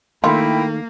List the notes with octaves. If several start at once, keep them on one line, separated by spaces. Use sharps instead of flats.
D#3 A3 A#3 E4 F4 G5 B5